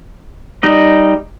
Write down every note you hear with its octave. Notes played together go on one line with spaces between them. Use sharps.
G3 D#4 D#5